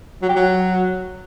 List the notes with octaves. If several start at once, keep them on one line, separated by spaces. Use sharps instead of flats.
F#3
G4
F#3